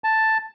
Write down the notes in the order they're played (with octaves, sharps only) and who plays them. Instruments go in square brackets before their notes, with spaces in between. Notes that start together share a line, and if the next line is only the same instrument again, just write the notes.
[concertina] A5